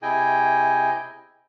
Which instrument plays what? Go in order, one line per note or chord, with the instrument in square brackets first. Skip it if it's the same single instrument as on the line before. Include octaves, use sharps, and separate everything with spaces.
[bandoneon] C3 E4 G#4 D#5 G5 G#5